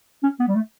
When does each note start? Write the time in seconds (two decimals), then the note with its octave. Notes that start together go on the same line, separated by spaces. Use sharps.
0.23 C#4
0.39 B3
0.48 G3
0.55 A3